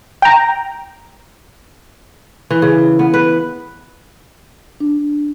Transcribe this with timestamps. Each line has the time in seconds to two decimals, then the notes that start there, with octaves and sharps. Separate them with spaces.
0.22 G5 A#5
2.50 E3
2.62 C#3
2.99 B3
3.14 B4
4.80 D4